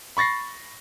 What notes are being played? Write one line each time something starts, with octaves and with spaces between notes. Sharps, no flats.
B5 C#6 A6 A#6 C7